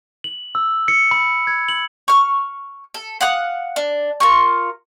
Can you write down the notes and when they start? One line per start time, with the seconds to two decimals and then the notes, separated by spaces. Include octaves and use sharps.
0.24 F#7
0.55 E6
0.88 C#7
1.11 B5
1.47 G#6
1.68 F#7
2.08 C#6 F6
2.94 A4
3.21 F5 F#5 D#6 F#6
3.76 D4
4.20 F4 A#4 C#6